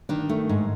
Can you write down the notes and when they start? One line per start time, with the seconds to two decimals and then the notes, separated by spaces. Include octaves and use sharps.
0.09 D#3 D4
0.29 A3
0.49 G#2